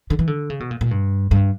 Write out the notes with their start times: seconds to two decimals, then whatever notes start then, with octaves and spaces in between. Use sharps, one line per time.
0.10 D3
0.19 E3
0.27 D3
0.50 C#3
0.60 B2
0.71 A#2
0.81 A#2
0.91 G2
1.31 G2